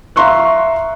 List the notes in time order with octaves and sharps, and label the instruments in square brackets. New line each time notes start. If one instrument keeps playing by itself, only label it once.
[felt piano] E5 F5 A#5 C6 C#6 F#6